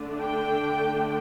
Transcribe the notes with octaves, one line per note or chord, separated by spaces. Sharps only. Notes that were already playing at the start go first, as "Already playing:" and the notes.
Already playing: D3 A3 D4
G5